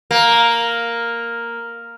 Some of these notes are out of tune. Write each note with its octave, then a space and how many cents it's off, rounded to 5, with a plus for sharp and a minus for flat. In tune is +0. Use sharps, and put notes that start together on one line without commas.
A#3 +0